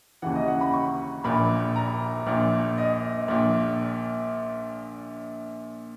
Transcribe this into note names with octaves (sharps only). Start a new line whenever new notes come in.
D#2 C#3 E3 F#5
D#5
F#5
B5
C#6
A#1 A#2 B5
A#5
A#1 A#2
D#5
A#1 A#2